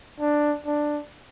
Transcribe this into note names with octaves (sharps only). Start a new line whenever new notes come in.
D4
D4